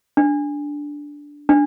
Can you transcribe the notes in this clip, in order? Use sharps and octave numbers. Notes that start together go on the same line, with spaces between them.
D4
D4